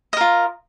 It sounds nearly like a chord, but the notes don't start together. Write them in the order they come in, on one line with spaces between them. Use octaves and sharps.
D#5 A#4 F4